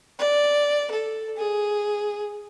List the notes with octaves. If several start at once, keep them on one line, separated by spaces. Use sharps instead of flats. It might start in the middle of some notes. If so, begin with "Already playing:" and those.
D5
A4
G#4